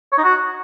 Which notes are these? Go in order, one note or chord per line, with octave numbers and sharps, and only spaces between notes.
C#5
D#4
F#4